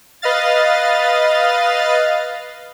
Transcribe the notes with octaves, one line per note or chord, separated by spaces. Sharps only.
B4 D#5 F5 A6